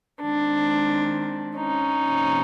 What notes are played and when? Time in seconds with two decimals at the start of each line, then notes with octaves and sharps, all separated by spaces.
0.23 D#3 G#3 C4 D4
1.58 C#4 D#4
2.03 C3 F3 A#3